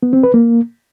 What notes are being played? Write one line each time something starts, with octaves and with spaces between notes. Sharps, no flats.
B3
C4
B4
A#3